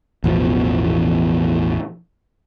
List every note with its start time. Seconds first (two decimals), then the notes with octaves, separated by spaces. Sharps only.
0.24 A1 E2 B2 F3